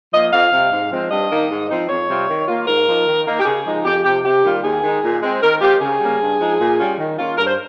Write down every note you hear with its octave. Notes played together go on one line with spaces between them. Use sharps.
F3 A#3 F4 D#5
F2 F5
C3 G3
G#2
F3 G#3 C4
G2 D#5
D#3 A#3 D#4
G#2
F3 C4 D#4
F2 C#5
C3 G3 C4 F4
D#3
A#3 F4
G#2 A#4
F3 A#3 D#4
D#3
A#3 D#4
G4
C#3 G#4
F3 G#3 D#4
F2 G4
C3 F3 G4
C3 G4
D#3 G3 A#3 F4
D#2 G#4
D#3 G#3 D#4
A#2
G#3 C4
D#3 A#4
G#3 C4 F4 G4
C#3 G#4
G3 A#3 C#4
G2
F3 G#3 D#4
A#2
G3 C#4 F4
D#3
A#3 C#4 F4
G2 A#4
C5